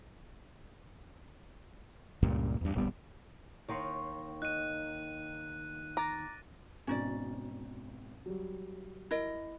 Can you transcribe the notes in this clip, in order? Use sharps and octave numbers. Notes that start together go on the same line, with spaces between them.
C#2 G2 A#2 G3
E2 G2
D1 A#1 G3 B3
D#2 D#3 C#5 C6 C#7
D#4 F#6 D#7
A#5 D6 A6 A#6
G#1 B2 C#4 D#4 D5
F#3 G3
E4 A#4 D#5